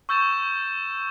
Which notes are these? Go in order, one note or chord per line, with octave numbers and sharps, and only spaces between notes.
C#6 E6 G6 A6 E7